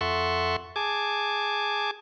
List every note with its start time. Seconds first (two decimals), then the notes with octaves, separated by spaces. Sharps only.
0.01 F2 A4 E5 F#5 C6 C#6
0.76 G#4 G#5 A5 D6